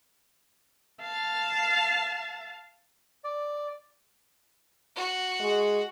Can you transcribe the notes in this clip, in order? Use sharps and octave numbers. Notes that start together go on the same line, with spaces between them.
F5 A5
D5
F#4
G#3